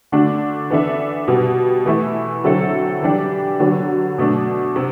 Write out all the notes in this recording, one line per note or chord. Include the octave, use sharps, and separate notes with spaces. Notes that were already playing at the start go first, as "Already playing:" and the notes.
D3 A3 D4 F#4
E3 B3 D4 A4 E5
B2 G3 B3
E3 A3 E4
D3 F#3 C4 E4 A4
E3 G3 D4 G4 D5
D3 F#3 B3
B2 A3 D4
C3